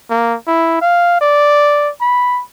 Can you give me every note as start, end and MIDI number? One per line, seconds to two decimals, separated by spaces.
0.10 0.35 58
0.47 0.77 64
0.81 1.19 77
1.21 1.90 74
2.01 2.42 83